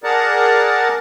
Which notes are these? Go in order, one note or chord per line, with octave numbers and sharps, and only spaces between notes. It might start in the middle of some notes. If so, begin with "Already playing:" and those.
G#4 A#4 D5 F#5 A5 A#5